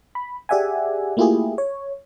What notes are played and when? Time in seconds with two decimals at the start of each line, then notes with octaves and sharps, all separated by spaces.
0.15 B5
0.49 G4 G#4 D5 E5 F#5 G#5
1.17 A3 A#3 E4 F4 G4 G#4
1.58 C#5